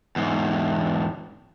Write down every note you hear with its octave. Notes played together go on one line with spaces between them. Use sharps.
E2 G#2